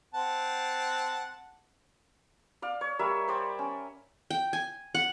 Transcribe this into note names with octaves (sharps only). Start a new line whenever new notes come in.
C4 F#5 A5
D5 F5
C#5
G3 A#4 E5
C5 D5 G5
C#4
G5
G#5
F#5